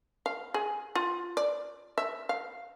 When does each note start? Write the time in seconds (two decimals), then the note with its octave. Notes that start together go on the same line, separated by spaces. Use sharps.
0.26 F5
0.54 G#4
0.95 F4
1.37 D5
1.98 E5
2.29 F5